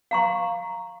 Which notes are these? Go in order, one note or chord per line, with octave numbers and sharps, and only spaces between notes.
F5 A#5 C#6